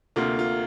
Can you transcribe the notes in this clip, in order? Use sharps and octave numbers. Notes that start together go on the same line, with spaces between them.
D2 C3 A#3 F4
F4